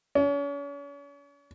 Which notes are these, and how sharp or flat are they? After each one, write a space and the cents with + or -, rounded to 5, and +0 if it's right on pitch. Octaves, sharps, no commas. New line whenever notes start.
C#4 +40